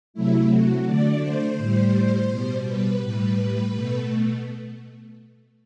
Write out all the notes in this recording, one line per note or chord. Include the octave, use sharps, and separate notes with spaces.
C3 F#3 A3 E4
F#4
D3 A3 D5
C5
A2 G3
B2 G3
B4
A2 G3
B2 A3